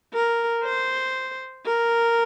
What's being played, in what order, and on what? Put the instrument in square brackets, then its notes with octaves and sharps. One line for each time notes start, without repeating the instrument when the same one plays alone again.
[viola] A#4
C5
A#4